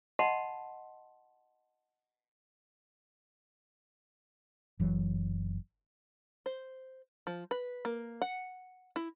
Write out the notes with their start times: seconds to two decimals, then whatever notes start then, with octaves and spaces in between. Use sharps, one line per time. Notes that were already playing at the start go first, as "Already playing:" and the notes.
0.19 D#5 F#5 A5 B5 C6
4.80 F#1 E3 F#3
6.46 C5
7.27 F3
7.51 B4
7.85 A#3
8.22 F#5
8.96 E4